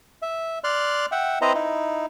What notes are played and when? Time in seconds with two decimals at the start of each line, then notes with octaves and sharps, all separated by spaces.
0.22 E5
0.64 D5 C6 F6 F#6
1.12 E5 F#5 G5
1.42 C4 E4 B4 C5 D#5 A#5
1.55 D#4 E4